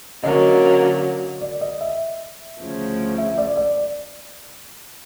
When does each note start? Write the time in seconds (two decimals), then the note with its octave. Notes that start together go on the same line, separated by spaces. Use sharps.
0.23 D3 F#3 A#3 C#4 D#5
1.41 D5
1.61 D#5
1.81 E5
2.60 D2 C#3 F3
3.18 E5
3.38 D5
3.57 D5